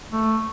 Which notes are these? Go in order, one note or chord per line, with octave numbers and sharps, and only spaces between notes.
A3